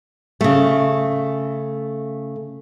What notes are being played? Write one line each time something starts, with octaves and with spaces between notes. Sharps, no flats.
C#3 A3